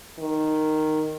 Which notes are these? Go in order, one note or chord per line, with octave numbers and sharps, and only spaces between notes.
D#3